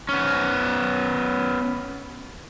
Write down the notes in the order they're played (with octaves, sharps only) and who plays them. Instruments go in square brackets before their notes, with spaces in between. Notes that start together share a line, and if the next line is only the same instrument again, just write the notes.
[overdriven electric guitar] B3 C#4